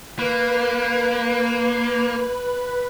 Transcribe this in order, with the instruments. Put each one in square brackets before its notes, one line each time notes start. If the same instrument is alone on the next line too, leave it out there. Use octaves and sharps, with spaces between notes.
[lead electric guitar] A#3 [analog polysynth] B4